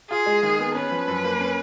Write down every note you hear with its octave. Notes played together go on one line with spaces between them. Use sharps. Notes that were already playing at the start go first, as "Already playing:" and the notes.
F4 G#4
G#3
D#3
B3
C#4 B4
F3
F#2
A#3
C#4